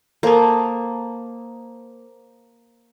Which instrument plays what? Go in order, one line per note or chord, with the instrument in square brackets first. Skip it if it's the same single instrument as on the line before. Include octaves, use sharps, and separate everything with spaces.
[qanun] A#3 [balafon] A4 A#4 [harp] C5 A5 D#6